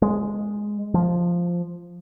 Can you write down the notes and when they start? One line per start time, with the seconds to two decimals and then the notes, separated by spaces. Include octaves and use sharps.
0.02 G#3
0.94 F3